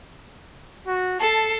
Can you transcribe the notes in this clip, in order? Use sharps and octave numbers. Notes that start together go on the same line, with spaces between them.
F#4
A4 A5 C7